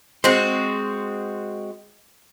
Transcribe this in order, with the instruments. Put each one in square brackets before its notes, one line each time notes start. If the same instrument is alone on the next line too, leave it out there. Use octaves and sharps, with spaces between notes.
[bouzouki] G#3 C4 F#4 [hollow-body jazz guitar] C5